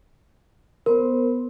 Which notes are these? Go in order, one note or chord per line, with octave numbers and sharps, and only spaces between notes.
B3 A#4 C5 C6